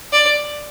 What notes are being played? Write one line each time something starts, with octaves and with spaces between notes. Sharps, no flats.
D5